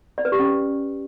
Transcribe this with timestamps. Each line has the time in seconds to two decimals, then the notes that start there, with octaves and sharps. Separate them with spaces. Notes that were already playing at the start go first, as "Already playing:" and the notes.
0.18 D5
0.25 B4
0.32 G4
0.39 C#4